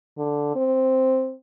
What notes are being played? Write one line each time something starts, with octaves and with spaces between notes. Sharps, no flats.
D3
C4